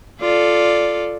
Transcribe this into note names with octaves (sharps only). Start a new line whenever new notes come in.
F4 A4 D5